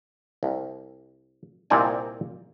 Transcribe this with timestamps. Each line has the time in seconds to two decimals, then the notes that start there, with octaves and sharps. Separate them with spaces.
0.43 C2
1.70 C2 A#2 C4 D#4 D5 G#5